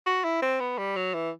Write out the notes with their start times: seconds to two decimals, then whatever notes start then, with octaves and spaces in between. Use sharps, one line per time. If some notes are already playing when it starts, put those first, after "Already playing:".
0.06 F#4
0.24 E4
0.42 C4
0.60 B3
0.78 G3
0.96 F#3
1.14 E3